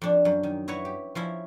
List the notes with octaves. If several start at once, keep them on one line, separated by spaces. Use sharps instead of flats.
F2 D4
F#2
D#3
E4 F#4 B4 C#5
G4
F3 C#4 E4